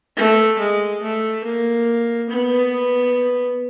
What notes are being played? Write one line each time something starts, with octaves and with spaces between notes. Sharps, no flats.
A3
G#3
A3
A#3
B3